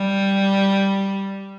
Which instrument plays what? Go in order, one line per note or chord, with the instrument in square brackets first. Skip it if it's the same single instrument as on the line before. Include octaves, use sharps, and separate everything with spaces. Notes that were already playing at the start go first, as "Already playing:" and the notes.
Already playing: [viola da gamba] G3